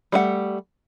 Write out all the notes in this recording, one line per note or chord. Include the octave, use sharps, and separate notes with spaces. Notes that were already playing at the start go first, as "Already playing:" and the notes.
G3 A3 F#5